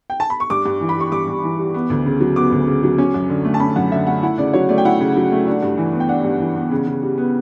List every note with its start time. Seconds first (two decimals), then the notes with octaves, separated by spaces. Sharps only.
0.10 G5
0.20 A5
0.30 B5
0.40 C#6
0.50 G2 D6
0.66 G2
0.81 E3
0.89 B5
0.97 G3 C#6
1.12 G2 D6
1.28 G2
1.44 E3
1.59 G3
1.74 B3
1.90 D2
2.06 C#3
2.20 F#3
2.36 B3 D6
2.52 D2
2.67 C#3
2.83 F#3
2.98 C#4
3.14 F#2
3.29 D3
3.45 A3
3.54 A5
3.60 C#4 B5
3.76 F#2 F#5
3.92 D3 E5
4.07 A3 F#5
4.23 E4 F#5
4.38 C#3 D5
4.53 F#3 C#5
4.69 A3 D5
4.78 G5
4.85 E4 F#5
5.00 C#3
5.17 F#3
5.32 A3
5.47 D4
5.63 G2
5.78 E3
5.93 B3
6.00 G5
6.09 D4 F#5
6.25 G2
6.40 E3
6.56 B3
6.71 C#3
6.87 C#3
7.02 G3
7.18 B3